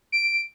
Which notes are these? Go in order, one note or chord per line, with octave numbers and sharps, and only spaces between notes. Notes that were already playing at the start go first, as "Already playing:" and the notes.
D7